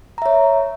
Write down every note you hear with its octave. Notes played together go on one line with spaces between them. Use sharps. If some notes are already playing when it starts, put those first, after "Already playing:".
C#5 E5 A#5